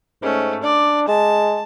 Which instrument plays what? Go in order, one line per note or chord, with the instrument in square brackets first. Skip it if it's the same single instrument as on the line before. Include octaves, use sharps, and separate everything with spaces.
[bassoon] G#2 [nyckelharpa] A3 C#4
[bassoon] D4 [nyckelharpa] D5
[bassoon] G#3 [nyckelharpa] A5